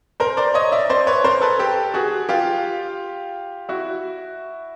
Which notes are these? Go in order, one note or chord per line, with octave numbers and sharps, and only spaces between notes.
A#4 C5
C5 D5
C#5 D#5
D5 E5
C5 D5
B4 C#5
A#4 C5
A4 B4
G4 A4
F#4 G#4
F4 G4
E4 F#4